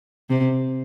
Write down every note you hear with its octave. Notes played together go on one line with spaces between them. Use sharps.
C3